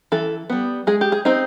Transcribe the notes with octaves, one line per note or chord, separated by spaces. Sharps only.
E3 A4
G3 B3
G#3 G#4
G4
G#4
C4 D#4